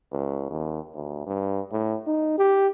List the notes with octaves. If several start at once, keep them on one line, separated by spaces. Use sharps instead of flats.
C#2
D#2
D2
G2
A2
D#4
G4